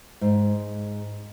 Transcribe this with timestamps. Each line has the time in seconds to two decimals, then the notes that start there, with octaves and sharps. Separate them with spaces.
0.21 G#2